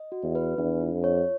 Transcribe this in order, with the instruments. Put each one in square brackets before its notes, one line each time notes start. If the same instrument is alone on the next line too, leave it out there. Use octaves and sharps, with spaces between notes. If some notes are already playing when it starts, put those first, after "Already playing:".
Already playing: [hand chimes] D#5
F#4
[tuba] E2
[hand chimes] B4
[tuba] E2 [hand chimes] D4
[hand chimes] F4
[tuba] F2
[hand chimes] C#5